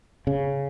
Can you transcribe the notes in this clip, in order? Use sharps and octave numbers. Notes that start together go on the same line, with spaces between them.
C#3